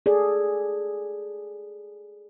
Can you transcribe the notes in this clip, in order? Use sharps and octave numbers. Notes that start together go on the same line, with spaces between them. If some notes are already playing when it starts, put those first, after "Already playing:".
G#4 A4 D5